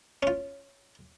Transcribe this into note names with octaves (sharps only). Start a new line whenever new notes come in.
C#4 F4